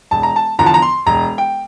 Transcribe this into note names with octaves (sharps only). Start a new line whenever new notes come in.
E1 A5
A#5
A5
E2 D3 F3 A#5
A5
A#5
C6
E1 A#5
G5